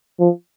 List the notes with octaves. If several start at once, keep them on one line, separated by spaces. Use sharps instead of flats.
F3